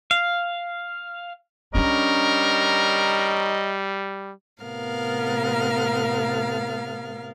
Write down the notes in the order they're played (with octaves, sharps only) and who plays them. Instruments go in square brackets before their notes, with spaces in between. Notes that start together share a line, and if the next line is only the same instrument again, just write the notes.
[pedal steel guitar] F5
[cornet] G3 [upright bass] C#4 D4 [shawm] A#4 [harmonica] C#5 D#5 A#5
[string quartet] A2 C3 B3 A#4 F5 F6